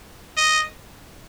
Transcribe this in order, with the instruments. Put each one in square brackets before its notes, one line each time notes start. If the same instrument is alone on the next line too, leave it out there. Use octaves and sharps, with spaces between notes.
[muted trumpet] D#5